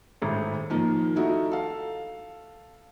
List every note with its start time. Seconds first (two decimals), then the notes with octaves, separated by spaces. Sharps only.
0.22 G#1 A2
0.70 D#3 F3 A#3
1.16 A3 D#4 E4 F#4
1.52 A4 F5